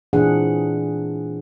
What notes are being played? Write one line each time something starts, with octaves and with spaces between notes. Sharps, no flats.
A#2 E3 C4 D4 G#4 F#5